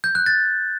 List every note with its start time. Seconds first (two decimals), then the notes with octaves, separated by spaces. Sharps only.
0.04 G6
0.15 F#6
0.26 A6